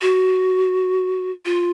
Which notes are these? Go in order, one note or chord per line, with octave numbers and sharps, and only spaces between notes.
F#4
F4